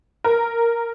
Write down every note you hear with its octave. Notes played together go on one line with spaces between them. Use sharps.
A#4